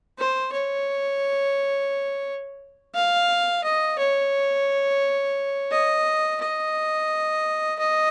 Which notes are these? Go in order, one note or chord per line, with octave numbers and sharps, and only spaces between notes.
C5
C#5
F5
D#5
C#5
D#5
D#5
D#5